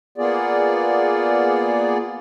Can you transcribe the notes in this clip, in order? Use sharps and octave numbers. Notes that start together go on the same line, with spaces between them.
A#3 B3 F4 G#4 D5